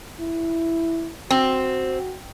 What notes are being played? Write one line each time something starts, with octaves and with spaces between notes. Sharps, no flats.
E4
C4 F#4